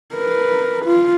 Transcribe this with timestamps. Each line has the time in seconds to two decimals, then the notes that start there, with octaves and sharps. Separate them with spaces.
0.14 A#4 B4
0.85 F4